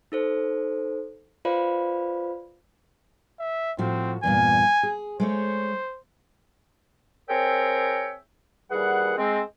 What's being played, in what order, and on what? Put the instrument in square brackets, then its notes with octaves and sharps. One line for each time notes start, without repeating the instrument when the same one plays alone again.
[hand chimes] D#4 A4 C5
F4 B4 C5 D5 F5 B5
[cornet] E5
[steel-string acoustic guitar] A2 F3 F#4 [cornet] C4
[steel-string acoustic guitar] E2 G2 A#2 [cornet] G#5
[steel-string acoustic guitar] G#4
[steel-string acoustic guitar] G#3 A3 C#5 [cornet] C5
[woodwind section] C4 G#4 A#4 C#5 E5 G5
D#2 E3 G3 G#4 F#5
G#3 C4